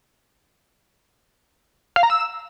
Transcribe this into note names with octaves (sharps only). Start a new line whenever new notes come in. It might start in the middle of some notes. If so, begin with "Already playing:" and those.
F5
A#5
E6